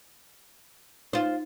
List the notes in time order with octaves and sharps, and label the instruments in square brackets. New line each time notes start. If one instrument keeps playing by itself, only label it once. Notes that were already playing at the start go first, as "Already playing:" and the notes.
[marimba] D#4 [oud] F4 C5